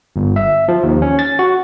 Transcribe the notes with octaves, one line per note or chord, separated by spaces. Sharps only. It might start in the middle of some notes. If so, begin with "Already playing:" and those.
G1
E5
F3
D#2
C#4
A6
F#4